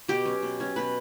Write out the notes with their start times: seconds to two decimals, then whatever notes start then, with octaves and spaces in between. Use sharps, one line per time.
0.08 B2 G4
0.25 F#3 C#4
0.43 B2
0.60 F#3 C#4
0.76 B2 B4